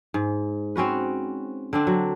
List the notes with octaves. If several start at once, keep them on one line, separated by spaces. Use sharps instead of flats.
G#2
C4 C#4 F#4 B4
D3 C4 D4
F#3